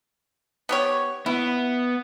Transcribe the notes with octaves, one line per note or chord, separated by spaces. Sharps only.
B3 G4 C#5
B3 E4